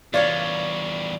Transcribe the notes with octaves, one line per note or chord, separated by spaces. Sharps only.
E2 G3 F4 C#5 D5 F5